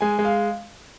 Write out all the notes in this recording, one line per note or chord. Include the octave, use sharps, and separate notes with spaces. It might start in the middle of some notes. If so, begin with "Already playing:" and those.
G#3 G#5
G#3
F5